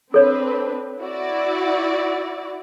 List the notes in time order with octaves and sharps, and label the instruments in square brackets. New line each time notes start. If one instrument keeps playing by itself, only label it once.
[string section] C4 D4 B4 [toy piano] A4 C#5
[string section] E4 F#4 D5